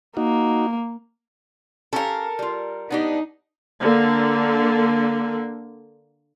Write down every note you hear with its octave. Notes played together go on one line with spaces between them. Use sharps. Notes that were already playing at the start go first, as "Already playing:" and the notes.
A#3 D#4 F#4
C#4 G4 A4 A#4 F5
G3 F4
B3 D4 D#4 G4
D3 A#3